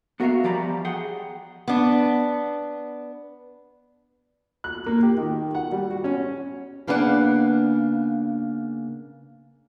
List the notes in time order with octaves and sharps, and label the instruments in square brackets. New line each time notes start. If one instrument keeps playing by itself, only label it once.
[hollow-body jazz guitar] B3 F#4 A#4 C5 E5 F5
E3 F3 G3 D5 A#5 B5
G#4 F#5 G5
[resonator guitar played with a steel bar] B3 D4
[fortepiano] F#6
A#3
G4
D#3
F#5
G3
F#4
C#4
[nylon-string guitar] C#3 A#3 B3 D4 C#5 F#5